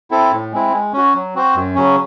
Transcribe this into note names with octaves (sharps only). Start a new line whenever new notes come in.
C4 E4 A4
A2
G#3 C4 E4
G#3
C#4 F#4
F#3
C4 F#4 C5
F#2
C#3 F#3 C#4